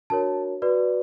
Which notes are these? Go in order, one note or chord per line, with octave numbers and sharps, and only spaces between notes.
D4 F#4 A#4 C#5 A5
F#4 B4 D5